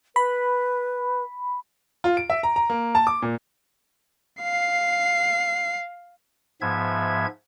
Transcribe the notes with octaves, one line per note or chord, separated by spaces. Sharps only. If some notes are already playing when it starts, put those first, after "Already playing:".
B4 B5
F4
D7
E5
A#5
A#5
A#3
A5
D6
A#2
F5 C7
G#2 F3 B3 E5 G#6